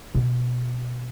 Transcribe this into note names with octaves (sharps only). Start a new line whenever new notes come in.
B2